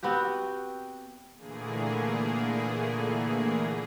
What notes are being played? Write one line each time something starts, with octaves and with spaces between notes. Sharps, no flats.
B3 C4 F#4 G4
A#2 D3 E3 A3 A#3 G#4